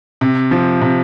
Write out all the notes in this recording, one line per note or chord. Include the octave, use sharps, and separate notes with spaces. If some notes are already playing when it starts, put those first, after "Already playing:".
C3
F3
C3